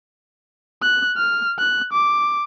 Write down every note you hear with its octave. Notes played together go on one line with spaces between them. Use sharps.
F#6
F6
F#6
D6